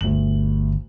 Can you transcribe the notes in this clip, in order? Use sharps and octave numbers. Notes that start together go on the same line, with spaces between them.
G1 D2 F#7